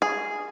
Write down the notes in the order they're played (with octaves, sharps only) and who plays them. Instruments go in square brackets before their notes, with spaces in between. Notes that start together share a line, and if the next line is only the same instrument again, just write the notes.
[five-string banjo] G#4